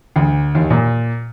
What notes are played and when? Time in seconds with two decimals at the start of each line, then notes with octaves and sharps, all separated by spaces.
0.16 D2
0.55 D#2
0.70 A#2